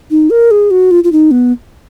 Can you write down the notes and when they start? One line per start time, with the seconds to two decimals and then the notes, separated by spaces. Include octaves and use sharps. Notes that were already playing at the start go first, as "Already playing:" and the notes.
0.11 D#4
0.30 A#4
0.51 G#4
0.71 F#4
0.91 F4
1.04 F4
1.12 D#4
1.31 B3